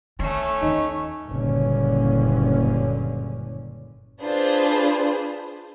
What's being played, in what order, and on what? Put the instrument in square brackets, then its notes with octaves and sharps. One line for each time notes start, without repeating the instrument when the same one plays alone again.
[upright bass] D#3 [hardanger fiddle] A3 C#4
[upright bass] D#2 [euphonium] D#4
[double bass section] F#1 G2 A#2 D3 C#4
[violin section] D4 F4 G#4 B4 C5